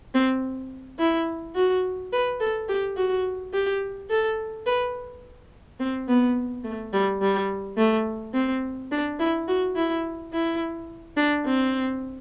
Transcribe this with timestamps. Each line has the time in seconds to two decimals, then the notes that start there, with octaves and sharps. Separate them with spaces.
0.14 C4
0.99 E4
1.56 F#4
2.13 B4
2.40 A4
2.68 G4
2.97 F#4
3.53 G4
4.10 A4
4.66 B4
5.80 C4
6.08 B3
6.64 A3
6.93 G3
7.21 G3
7.77 A3
8.34 C4
8.91 D4
9.19 E4
9.48 F#4
9.76 E4
10.33 E4
11.17 D4
11.45 C4